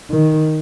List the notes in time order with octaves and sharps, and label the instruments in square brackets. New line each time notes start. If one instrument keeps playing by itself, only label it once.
[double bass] D#3